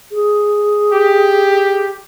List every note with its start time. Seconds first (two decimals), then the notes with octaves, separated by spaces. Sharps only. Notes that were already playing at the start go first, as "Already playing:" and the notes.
0.12 G#4
0.92 G4